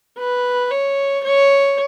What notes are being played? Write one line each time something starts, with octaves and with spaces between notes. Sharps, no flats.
B4
C#5
C#5